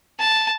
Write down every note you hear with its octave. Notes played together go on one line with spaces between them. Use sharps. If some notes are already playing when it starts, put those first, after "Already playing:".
A5